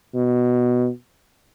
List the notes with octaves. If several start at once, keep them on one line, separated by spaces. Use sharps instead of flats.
B2